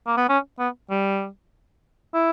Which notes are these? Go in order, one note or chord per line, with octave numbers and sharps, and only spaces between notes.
A#3
B3
C#4
B3
G3
E4